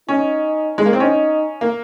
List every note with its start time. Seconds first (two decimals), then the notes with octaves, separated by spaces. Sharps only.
0.09 C#4 D#4
0.78 G#3
0.86 A#3
0.93 C4
1.00 C#4 D#4
1.61 A#3